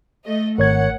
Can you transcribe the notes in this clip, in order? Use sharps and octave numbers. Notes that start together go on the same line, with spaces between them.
A3 D#5
G#1 A#4 C#5 F#5 G#6